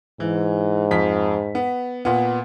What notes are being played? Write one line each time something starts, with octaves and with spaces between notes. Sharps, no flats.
G#2 E3
F2 B6
B3
A#2 B3